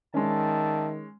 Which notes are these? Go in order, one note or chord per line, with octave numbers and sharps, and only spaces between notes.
D#3 G#3 C#4 D5 E5 A5